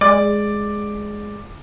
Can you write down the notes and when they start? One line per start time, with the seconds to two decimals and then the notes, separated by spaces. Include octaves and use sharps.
0.01 G#3 D5